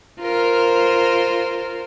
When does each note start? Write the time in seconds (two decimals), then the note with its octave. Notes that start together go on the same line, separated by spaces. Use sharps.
0.21 F4 A#4 C5